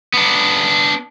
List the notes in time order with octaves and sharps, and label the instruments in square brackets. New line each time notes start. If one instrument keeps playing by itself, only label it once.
[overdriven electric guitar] B3 D4